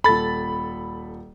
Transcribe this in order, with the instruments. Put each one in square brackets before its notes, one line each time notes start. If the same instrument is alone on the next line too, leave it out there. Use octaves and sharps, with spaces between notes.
[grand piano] D#1 A4 [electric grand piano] B5 A6